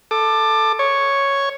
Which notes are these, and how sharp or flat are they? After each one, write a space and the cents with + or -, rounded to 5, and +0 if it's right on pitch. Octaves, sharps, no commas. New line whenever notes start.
A4 +0 D6 +20
C#5 +0 C#6 +0